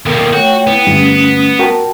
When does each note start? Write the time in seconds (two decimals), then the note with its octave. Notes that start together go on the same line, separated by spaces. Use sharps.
0.06 D#2 B2 A4 A#4
0.33 A3 F#4 C#5 G5 G6
0.67 B3 E4 G5
0.87 G2 D3 A3 C#4 D#6
1.59 F#4 A#4 G5 A5